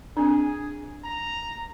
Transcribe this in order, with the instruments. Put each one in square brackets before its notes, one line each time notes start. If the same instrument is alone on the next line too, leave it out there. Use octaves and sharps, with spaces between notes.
[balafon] C4 D4 [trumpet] G#4
[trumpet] A#5